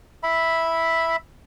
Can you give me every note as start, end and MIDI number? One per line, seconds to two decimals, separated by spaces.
0.23 1.16 76
0.23 1.16 83